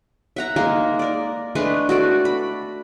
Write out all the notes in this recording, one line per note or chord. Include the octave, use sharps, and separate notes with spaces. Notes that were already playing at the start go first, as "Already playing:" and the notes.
E5 F#5 A#5
G#3 A#3 D#4 A#4
A#4 D5
G#3 A3 D4 B4
F#4 A4 D5
B5